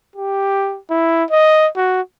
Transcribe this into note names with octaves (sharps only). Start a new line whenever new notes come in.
G4
E4
D#5
F#4